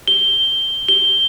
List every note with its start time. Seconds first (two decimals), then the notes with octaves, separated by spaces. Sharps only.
0.08 G7
0.89 G7